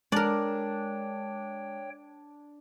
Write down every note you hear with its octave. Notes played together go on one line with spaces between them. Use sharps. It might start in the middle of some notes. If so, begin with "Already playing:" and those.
G#3 D4 A#4 C#5 D5 G5